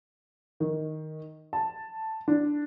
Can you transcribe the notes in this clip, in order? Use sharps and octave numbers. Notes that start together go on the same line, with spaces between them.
D#3
A5
D4